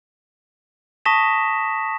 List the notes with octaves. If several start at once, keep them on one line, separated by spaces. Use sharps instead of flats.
A5 C#6 D#6 A#6 B6 E7